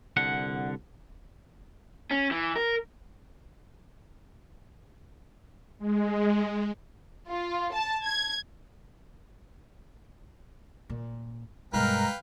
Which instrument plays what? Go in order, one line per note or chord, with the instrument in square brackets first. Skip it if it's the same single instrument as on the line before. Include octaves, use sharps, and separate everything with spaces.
[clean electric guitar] C2 D3 F#5
[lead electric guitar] C#4
E3
A#4
[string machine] G#3
[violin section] F4
A5
G#6
[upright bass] A#2
[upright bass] G2 B2 [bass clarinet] G#3 [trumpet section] A#4 [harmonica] B4 F5 G5